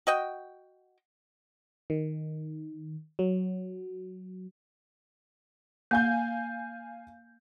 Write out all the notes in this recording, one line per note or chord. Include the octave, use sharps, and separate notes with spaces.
F#4 D#5 G5
D#3
F#3
A#3 F5 G#5 G6